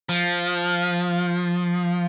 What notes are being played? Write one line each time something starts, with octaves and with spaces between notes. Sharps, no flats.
F3